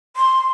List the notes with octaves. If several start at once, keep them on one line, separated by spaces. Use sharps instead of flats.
C6